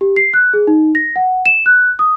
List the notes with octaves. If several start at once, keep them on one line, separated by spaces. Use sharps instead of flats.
G4
C7
F#6
G#4
D#4
A#6
F#5
E7
F#6
D#6